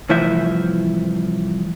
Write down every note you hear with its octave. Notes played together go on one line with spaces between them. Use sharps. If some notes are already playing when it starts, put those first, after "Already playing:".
C2 A2 E3 F3 C5 E5